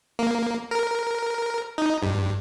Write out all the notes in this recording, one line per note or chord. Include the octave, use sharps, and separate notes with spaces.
A#3
A#4
D#4
G2